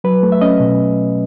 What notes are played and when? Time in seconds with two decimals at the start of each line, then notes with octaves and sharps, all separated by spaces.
0.04 F#3 B4
0.23 A3
0.32 E5
0.42 C#4 D#5
0.60 B2